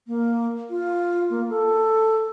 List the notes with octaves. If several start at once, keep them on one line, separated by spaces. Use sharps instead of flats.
A#3
F4
A#3
A4